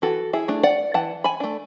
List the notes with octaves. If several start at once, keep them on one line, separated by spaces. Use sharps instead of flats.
E3 F#4 A4
E4 G#4
A3 D4
D5 F#5
E3 F#5 A5
G#5 B5
A3 D4